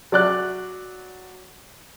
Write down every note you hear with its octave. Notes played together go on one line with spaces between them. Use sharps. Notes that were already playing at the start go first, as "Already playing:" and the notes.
F#3 D5 F#6